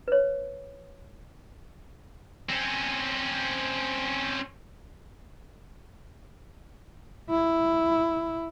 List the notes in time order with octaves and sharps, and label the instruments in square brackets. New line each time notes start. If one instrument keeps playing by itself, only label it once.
[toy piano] B4 C#5
[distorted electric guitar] C4 C#4
[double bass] E4